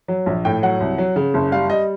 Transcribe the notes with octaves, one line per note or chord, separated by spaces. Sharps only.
F#3
A#1
A2 G5
F#3 F#5
C2
F#3
C#3
F#1
G3 F5
G3 D#5